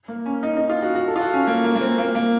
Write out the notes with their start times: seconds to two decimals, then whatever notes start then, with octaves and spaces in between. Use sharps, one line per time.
0.08 A#3
0.26 C#4
0.43 D#4
0.57 D#4
0.70 F4
0.82 F#4
0.95 F#4
1.08 A4
1.16 F4
1.21 F#4
1.34 C#4
1.47 A#3
1.64 A#3
1.76 A#3
1.81 C4
1.98 A#3
2.15 A#3